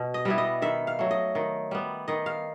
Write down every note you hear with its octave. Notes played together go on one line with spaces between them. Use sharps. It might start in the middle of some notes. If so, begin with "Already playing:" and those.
Already playing: B2
D#5
G3 B3 E4
D#5
D#3 E5
F5
F#3 A3
D#5
D#3
G3 B3
D#3 D#5
F5